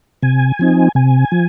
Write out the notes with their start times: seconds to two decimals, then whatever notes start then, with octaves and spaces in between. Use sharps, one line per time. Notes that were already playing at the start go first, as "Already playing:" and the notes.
0.22 C3 G#5
0.59 F3 C4 D#4
0.95 C3 G#5
1.32 F3